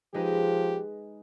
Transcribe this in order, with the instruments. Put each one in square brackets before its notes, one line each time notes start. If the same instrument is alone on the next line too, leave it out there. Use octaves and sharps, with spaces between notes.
[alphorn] F3 [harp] G#3 D#4 B4 [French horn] G4